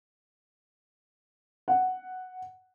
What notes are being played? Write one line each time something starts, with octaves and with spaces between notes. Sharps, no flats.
F#5